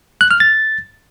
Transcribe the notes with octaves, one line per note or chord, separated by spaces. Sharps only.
F#6
F6
A6